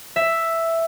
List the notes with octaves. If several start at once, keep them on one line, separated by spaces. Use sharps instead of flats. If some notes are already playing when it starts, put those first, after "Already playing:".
E5